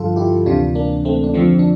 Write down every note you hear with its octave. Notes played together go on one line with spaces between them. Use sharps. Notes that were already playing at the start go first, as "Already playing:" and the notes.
Already playing: G2 D3 F3 F4 A4
E4 G4
D2 C3 E3 D4 F4
A#3 D4
A3 C4
D4
F2 D3 F3 A3 C4
D4